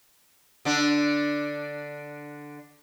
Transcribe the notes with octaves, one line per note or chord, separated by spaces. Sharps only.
D3 D4